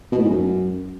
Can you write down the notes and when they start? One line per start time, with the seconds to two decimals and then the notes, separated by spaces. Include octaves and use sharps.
0.12 B2
0.18 A2
0.24 G#2
0.30 F#2